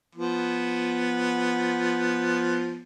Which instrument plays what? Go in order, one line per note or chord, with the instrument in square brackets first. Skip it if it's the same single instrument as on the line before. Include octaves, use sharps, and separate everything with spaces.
[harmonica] F3 B3